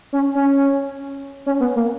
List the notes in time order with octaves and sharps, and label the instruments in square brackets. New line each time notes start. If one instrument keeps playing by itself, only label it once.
[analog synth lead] C#4
C#4
C#4
B3
A#3